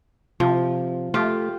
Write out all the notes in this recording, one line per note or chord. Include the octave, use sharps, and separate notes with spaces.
C3 F3
A3 F4 G4